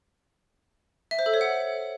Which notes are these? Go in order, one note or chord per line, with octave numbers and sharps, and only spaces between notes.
E5
C5
A4
C#5
F#5